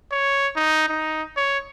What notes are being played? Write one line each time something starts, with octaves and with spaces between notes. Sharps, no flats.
C#5
D#4
D#4
C#5